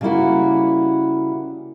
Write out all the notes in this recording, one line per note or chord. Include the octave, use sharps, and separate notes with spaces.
C#3 G3 A#3 E4 F#4